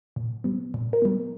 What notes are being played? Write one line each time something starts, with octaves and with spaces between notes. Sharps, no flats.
A#2
G3 B3
A#2
A#4
G3 B3